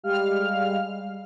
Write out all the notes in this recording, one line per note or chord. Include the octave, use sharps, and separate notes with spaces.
G3 G#3 F5 F6